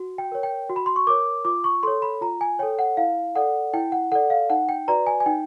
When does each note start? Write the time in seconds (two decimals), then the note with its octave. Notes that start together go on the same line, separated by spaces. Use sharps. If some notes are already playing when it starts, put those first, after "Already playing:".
Already playing: F#4
0.18 G5
0.32 A#4 C#5
0.43 G5
0.69 F#4
0.76 B5
0.86 C6
0.96 C#6
1.07 A#4 C#5 D6
1.45 F4 D6
1.64 C#6
1.83 A4 C#5 C6
2.02 B5
2.21 F4 A#5
2.41 G#5
2.59 A4 C#5 G5
2.79 F#5
2.97 E4 F5
3.36 A4 D5 F#5
3.74 E4 G5
3.92 F#5
4.12 A4 D5 F#5
4.30 F5
4.50 D#4 F#5
4.69 G5
4.88 F#4 B4 D5 A#5
5.07 G#5
5.20 G#5
5.26 D#4 G5